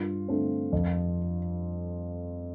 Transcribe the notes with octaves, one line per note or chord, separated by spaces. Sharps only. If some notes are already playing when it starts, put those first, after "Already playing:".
Already playing: G2 F4
D3 A3 C4
F2